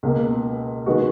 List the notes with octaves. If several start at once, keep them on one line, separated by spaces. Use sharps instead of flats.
C#2 B2 A#3
D#3 G#3 B3 F#4